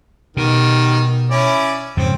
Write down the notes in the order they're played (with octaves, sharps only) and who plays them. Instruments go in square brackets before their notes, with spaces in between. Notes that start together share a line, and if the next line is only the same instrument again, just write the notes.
[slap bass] B2 [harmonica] D#3 G3
[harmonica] C#4 E4 D5
[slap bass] F2 G#2 C#3 [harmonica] C4